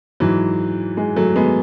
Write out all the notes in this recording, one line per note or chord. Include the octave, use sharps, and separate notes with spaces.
G#2 E3 F#3
G#3
F#3 A3
G#3 B3